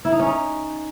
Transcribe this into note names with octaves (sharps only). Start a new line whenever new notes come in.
E4
D#4
C#4
D#4